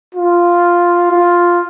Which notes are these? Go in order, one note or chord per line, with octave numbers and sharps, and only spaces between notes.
F4
F4